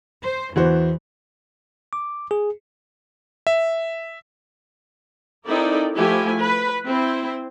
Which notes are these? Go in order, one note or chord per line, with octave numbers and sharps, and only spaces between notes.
C5
E2 E3 F#4 C5
D6
G#4
E5
C4 D#4 E4 A4 A#4 D5
F3 A3 E4 G4 G#5
B4
C4 E4 C5